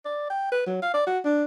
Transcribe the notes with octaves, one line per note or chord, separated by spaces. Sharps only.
D5
G5
B4
F#3
F5
D5
F#4
D4